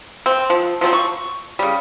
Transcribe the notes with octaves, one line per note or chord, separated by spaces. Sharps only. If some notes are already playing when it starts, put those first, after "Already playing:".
C4
F3
F3 F#3 B3 C4
C#6
C#3 G3